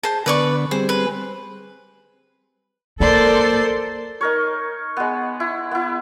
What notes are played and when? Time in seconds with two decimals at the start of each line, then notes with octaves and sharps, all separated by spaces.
0.03 G#4 C5 A5
0.26 D3 B3 B4 D5 C#6
0.71 G3 C4 G#4 C5
0.89 B4
3.00 A#3 A4 A#4 C5 D5 C6
4.21 D#4 A#4 C#5
4.97 G#3 B3
5.40 E4
5.71 B3 E4